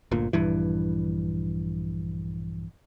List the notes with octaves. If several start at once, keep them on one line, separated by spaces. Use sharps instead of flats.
G1 D2 A#2
A#1 G2 E3